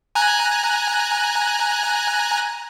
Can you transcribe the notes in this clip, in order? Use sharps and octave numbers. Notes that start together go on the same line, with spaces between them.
G#5 A#5 F#6